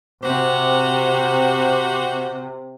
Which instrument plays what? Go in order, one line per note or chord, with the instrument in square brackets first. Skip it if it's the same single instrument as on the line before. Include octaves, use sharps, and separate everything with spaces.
[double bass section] C3 [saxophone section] F#4 G4 C5